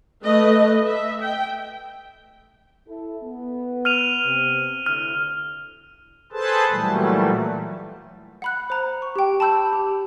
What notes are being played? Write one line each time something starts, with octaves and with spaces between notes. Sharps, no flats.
A3 B4 D#5
E5
G5
E4 A4
B3
F6 D#7 F7
C3
D2 D3 E4 F6
G#4 A4 B4 C5 A5
A#2 E3 F#3 G3 A3
F#5 B5 F#6
C5 A#5
C#6
G4 G5
A5 B5 E6 G6
G4